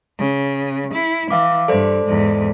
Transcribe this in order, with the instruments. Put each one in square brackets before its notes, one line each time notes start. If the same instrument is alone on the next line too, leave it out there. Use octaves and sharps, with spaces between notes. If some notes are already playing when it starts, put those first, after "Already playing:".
[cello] C#3
E4
[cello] E3 [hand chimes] E5 F5 D6
[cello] G2 [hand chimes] A4 C5 D5
[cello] E2 G#2